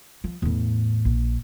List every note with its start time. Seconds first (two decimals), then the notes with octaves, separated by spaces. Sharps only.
0.24 F3
0.42 E2 A2
1.05 A#1